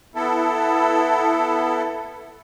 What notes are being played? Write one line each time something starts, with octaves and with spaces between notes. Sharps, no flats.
B3 E4 A4